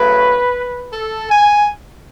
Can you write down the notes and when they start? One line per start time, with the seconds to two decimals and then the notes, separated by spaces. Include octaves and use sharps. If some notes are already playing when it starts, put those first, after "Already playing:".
Already playing: C#3 F#3 A3 B4
0.93 A4
1.30 G#5